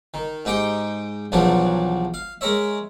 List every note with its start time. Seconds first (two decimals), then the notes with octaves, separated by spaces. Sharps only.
0.14 D#3
0.45 G#2 D#4 G4 G5
1.32 B1 E2 F3 F#3 D4 C#5
2.14 F5
2.41 G#3 A#4 C#5 E5